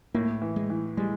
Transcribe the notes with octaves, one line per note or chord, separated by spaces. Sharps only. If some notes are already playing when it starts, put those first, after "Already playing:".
A2 A#3
E3
G#3
E3
G3 G#3